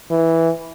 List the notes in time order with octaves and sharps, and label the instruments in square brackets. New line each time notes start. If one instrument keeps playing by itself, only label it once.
[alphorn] E3